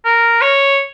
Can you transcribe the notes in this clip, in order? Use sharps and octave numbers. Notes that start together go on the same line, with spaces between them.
A#4
C#5